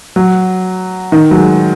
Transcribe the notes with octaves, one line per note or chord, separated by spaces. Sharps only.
F#3
D#3
F#3
G#3